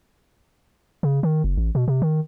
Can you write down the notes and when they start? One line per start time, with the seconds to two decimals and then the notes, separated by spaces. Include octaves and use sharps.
1.03 C#3
1.23 D#3
1.44 F#1
1.57 A1
1.75 B2
1.88 C3
2.02 D#3